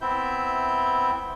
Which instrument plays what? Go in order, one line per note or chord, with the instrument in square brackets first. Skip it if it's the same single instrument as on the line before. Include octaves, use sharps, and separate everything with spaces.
[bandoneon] B3 C4 E4 E5 G6